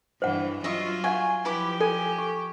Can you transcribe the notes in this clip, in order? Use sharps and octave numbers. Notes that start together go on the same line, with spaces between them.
G2 E3 C5 F#5
F#3 F4 D#5 E5 C#6
F5 F#5 G#5 C#6
F3 E4 G4 B4 D6
A4 G#5
C#6